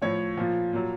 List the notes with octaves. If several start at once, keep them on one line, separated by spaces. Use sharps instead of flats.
A2 F3 C#5
A#2 F3
A#2 F#3